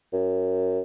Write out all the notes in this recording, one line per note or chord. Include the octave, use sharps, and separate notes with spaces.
F#2